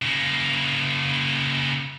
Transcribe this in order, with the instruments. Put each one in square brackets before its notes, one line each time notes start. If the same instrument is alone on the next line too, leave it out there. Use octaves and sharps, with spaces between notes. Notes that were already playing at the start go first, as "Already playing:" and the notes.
[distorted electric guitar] C#3 A#3